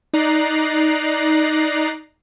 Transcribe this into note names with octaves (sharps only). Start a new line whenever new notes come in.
D#4 D5 A#5 F#6 C7